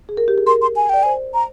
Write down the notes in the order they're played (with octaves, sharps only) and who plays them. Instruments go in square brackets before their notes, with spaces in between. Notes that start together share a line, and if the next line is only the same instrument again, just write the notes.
[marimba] G#4
A#4
G4
G#4
[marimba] A#4 [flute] C6
[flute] C6
G#5
[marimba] D5 [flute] G5
[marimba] C5 [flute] G#5
[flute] A#5